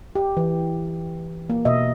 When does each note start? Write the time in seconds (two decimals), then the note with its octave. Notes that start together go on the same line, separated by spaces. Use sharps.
0.15 G4
0.37 E3
1.50 A#3
1.65 B2 D#5 E5